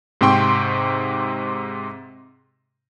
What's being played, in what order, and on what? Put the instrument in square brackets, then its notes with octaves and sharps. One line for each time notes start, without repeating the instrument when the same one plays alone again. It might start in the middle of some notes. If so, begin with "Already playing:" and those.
[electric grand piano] G#2 C3 C4 G5 C6 C#6